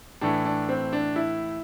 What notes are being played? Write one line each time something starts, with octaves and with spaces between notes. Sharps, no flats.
A2 E3 A3 D4
D4
C4
D4
E4